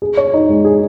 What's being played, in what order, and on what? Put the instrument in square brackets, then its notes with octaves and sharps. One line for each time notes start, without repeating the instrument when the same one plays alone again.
[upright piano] G#4
C#5
D#4
G#3
G#4